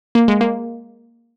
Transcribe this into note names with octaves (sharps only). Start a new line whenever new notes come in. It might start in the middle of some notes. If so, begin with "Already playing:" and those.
A#3
G#3
A#3